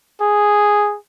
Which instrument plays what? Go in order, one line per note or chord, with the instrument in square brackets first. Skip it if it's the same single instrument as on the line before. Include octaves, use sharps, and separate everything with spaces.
[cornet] G#4